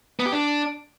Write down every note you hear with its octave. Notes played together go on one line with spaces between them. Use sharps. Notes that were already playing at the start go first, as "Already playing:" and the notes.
B3
G4
D4